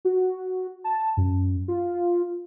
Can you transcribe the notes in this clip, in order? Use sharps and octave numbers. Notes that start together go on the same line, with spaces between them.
F#4
A5
F#2
F4